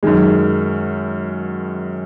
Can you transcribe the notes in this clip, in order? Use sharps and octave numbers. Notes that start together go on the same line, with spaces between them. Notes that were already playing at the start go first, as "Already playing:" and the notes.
F#2 D#3 G#3